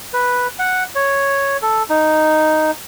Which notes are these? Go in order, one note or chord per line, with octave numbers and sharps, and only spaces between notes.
B4
F#5
C#5
A4
D#4